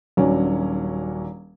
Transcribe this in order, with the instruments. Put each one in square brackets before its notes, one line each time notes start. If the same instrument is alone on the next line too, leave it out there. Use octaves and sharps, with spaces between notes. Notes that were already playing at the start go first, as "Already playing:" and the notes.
[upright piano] D#1 F#3 C#4 D4